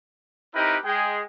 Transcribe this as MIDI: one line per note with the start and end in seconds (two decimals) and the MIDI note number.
0.54 0.77 60
0.54 0.77 63
0.54 0.77 64
0.54 0.77 67
0.54 0.77 70
0.54 0.77 71
0.85 1.22 56
0.85 1.22 68
0.85 1.22 79